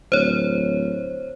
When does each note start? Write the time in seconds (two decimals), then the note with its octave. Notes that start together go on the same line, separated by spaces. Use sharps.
0.12 D1 C5 C#5